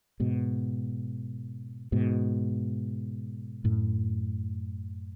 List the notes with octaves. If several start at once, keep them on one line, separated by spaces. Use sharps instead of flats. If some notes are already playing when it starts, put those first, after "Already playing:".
G#2 B2
G#2 B2
F#2 A2